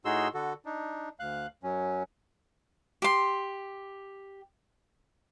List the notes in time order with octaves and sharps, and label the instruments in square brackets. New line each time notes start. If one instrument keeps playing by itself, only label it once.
[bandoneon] A2 D#4 F#4 G#4 C6 E6
D3 F#4 A4
D4 D#4
D2 F5 F#6
F#2 F#3 C#4
[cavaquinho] G4 C6